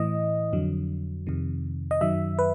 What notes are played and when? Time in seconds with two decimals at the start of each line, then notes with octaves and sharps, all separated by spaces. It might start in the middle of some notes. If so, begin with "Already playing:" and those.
Already playing: A2 E3 D#5
0.53 F2 D3 F#3
1.27 F2 C3 D#3
1.91 D#5
2.01 F#2 D#3 F#3 E5
2.39 B4